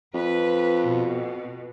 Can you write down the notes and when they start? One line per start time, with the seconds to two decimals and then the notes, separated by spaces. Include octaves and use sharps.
0.14 F2 B4
0.85 B2